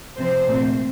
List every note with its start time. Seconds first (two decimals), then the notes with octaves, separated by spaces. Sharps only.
0.18 C3 F3 C4 C5
0.47 A#2 A3 C4